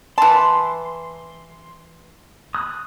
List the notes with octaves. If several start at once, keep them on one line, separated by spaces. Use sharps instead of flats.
E3 A5 C6
D#6 F#6